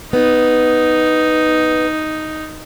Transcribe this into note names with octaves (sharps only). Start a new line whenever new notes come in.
B3 D#4